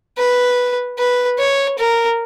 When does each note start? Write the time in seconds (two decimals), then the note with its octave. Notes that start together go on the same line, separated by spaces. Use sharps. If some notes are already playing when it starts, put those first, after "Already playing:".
0.18 B4
0.99 B4
1.39 C#5
1.79 A#4